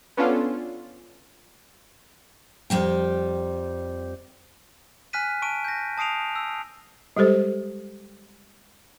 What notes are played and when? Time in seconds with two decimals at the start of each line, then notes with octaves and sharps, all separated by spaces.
0.17 B3 C#4 D4 F4 A4
2.70 F2 G3 G5
5.13 G#5 F6 F#6 B6 D#7
5.42 A5 C#6 D7 D#7
5.64 G6 A#6
5.98 A5 D#6 C7 D7 F7
6.36 E6
7.17 G3 G#3 G4 A4 C5